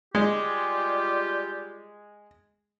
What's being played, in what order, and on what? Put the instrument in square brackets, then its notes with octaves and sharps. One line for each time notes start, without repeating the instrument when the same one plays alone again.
[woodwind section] G3 F4 G4 [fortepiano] G#3